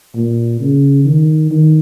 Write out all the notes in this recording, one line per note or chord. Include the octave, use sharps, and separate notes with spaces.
A#2
C#3
D#3
D#3